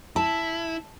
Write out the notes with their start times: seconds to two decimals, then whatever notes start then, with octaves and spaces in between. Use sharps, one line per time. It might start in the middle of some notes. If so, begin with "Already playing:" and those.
0.16 E4 A5